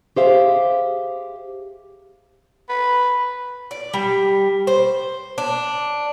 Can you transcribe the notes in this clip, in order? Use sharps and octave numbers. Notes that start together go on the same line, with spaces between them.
G4 G#4 C5 E5 F5
B4
D5
G3
C5
D4